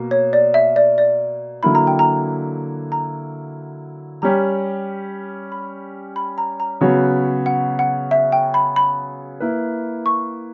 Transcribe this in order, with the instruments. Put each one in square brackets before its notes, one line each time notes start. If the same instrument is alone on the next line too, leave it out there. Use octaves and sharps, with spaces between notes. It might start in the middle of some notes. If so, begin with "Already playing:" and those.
Already playing: [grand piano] B2 A#3
[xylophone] C#5
D5
E5
D5
D5
[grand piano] D3 F#3 A#3 E4 [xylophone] B5
[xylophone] A#5
G5
A#5
A#5
[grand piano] G3 C#4 G4 [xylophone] A#5
[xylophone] B5
B5
A#5
A#5
[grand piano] C#3 F#3 B3 F#4 C#5
[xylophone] F#5
F#5
E5
G5
B5
B5
[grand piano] A#3 E4 B4
[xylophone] C#6